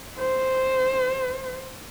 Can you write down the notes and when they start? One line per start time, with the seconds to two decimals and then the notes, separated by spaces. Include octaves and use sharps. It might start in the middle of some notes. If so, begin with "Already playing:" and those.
0.19 C5